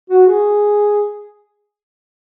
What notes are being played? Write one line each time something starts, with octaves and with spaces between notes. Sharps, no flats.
F#4
G#4